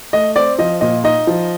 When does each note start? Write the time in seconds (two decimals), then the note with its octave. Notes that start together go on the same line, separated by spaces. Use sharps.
0.13 A3 D#5
0.36 C4 D5
0.59 F3 D#5
0.81 A#2 D#5
1.03 D#4 D#5
1.27 F3